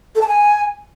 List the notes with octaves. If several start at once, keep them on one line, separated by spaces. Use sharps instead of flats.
A4
A5
G#5